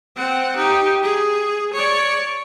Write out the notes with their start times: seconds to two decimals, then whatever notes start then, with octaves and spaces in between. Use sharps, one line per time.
0.17 C4 F#5
0.56 D#4 G4
1.03 G#4
1.73 C#5 D5